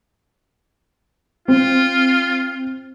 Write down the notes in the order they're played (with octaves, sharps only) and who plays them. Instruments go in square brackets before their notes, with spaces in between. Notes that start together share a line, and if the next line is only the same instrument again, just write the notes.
[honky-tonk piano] C4 [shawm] F4